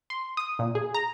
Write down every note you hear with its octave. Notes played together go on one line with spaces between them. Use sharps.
C6
D#6
A#2
G#4
A#5